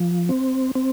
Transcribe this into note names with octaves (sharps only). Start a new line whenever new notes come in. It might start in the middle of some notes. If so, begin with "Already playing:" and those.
Already playing: F3
C4
C4